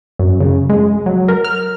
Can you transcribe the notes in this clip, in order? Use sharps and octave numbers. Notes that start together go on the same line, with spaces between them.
F#2
C#3
G#3
F#3
A#4
F6